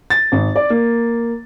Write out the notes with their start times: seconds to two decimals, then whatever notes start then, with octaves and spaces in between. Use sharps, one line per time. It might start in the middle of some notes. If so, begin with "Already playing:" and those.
0.10 A6
0.32 G#1
0.56 D5
0.70 A#3